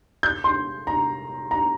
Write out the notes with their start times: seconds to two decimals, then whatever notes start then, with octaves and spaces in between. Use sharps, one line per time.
0.23 G6
0.44 C6
0.87 A#5
1.51 A#5